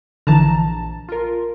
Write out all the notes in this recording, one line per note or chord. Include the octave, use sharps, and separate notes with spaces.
A#1 D3 E3 A5 A#5
F4 A#4